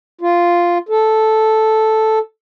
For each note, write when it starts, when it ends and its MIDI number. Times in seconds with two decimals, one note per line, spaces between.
0.21 0.78 65
0.89 2.19 69